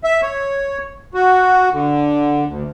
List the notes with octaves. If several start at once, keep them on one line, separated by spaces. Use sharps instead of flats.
E5
C#5
F#4
D3
D2